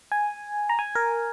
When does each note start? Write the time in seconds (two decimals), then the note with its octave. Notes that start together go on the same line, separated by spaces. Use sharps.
0.12 G#5
0.69 A#5
0.79 G#5
0.95 A#4